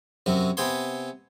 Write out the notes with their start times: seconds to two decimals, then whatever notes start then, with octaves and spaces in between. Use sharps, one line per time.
0.26 F#2 C3 F#3
0.57 C3 B3 G5 G#5 C6